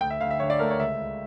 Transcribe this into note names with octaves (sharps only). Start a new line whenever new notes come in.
D2 G5
E5
D2 F5
E5
D3 C#5
D5
A3 A#4
C#5
C#2 E5
C#2